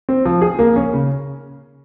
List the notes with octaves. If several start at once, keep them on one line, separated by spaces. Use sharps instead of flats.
C4
F3
G#4
A#3
C#4
C#3